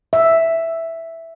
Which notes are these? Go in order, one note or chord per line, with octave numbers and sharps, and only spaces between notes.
E5